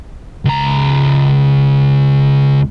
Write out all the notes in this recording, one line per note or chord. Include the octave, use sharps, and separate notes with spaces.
C#2 A#5